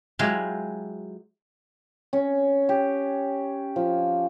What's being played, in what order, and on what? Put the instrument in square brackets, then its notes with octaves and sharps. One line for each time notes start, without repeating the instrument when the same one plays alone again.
[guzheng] F#3 G#3 E4 F4 G4
[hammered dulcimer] C#4
G4
F3